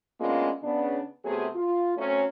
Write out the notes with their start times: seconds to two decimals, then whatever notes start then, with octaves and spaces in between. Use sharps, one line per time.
0.20 G#3 A#3 B3 C#4 D4 F4
0.63 C#3 B3 D4
1.25 C3 F#3 A3 B3 G#4
1.55 F4
1.97 F#3 A3 C4 C#4